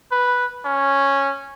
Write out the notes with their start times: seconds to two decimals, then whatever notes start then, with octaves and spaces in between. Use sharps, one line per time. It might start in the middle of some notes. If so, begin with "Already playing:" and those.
0.12 B4
0.65 C#4